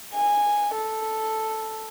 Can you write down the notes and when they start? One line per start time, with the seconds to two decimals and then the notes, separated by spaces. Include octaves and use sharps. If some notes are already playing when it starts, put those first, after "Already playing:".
0.14 G#5
0.76 A4